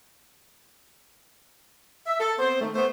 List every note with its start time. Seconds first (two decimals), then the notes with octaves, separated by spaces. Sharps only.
2.07 E5
2.20 A4
2.39 B3 C4 C5
2.61 D#3 A3
2.75 A3 B3 C5